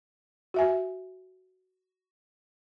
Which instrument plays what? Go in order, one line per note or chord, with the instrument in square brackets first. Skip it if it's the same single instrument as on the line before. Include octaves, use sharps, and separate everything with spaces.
[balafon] F#4 E5 G#5